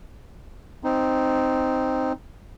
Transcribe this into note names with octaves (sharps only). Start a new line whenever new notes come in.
C4 D#4